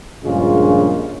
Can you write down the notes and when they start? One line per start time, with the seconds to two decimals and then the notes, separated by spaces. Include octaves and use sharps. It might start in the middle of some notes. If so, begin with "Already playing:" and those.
0.24 A#1 G2 C#3 G#3 F4